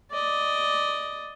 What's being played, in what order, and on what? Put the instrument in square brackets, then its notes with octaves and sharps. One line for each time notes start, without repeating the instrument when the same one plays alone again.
[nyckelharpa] D5 D#5